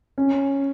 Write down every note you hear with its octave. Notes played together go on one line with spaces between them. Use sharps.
C#4